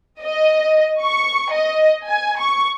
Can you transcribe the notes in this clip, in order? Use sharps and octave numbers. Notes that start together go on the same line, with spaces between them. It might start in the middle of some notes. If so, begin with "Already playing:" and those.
D#5
C#6
D#5
G#5
C#6